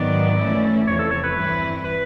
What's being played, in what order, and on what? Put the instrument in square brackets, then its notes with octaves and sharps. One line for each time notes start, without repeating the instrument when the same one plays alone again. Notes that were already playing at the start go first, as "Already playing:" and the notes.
Already playing: [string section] G#2 D#3 F#3 B3 [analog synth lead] D5
[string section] E3 A3 C#4 E4
[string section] E2 C3 F3 [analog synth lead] C#5
[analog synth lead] A4
C#5
B4
[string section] G2 E3 G3 C4 E4
[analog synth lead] B4